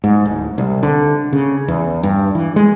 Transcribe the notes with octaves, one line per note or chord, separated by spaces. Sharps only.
G#2
D1
C2
D3
C#3
E2
G2
E3
G#3